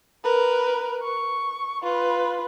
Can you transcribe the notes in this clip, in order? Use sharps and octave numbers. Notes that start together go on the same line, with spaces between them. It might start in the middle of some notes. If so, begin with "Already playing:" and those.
A#4 B4
C#6
F4 B4